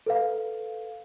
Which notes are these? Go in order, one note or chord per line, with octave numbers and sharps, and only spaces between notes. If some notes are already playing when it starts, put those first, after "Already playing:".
A4 B4 F5